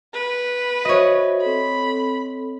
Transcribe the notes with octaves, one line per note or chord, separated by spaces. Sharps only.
B4
F#4 C5 C#5 D#5 E5
C4 A4 B5